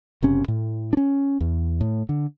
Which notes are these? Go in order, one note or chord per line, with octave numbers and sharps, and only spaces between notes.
F#1 C3 C#4
A2
C#4 D4
E2
A2
D3